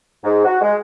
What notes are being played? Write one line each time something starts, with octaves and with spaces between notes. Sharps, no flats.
G#2
F#4
G#3